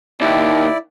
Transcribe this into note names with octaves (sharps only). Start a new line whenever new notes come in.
D#2 E4 D5